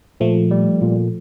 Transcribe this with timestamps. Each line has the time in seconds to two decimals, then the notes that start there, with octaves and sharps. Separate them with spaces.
0.20 A#2 F3 A3
0.51 G3
0.81 A#2